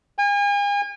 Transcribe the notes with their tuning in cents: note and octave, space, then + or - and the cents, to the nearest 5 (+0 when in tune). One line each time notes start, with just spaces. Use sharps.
G#5 -40